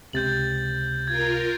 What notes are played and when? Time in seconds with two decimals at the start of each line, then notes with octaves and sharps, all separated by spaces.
0.13 C#2 C3 G6 A6 F#7
1.08 F4 A#4 G#6